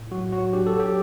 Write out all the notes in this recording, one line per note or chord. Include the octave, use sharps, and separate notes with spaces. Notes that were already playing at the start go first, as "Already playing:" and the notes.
Already playing: A2
F#3 F#4
F#3 F#4
D4 G4
A4
F#3
G4